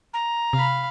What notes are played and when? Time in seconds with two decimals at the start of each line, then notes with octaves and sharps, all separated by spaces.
0.14 A#5
0.53 C3 F5 B5